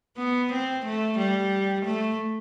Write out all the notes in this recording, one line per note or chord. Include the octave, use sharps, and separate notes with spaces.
B3
C4
A3
G3
A3